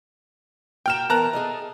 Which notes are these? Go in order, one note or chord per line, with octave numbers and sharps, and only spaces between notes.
A#2 F#4 G5 A#5 F6 E7
E2 A#4 B4 A5 A#5 F#6
G#4 A4 D#5